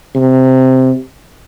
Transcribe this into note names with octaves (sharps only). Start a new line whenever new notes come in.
C3